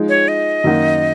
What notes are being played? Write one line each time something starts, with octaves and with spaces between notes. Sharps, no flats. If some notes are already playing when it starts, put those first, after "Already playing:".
Already playing: F3 G#3 D#4
C#5
D#5
F#2 D#3 A#3 D#4 F#4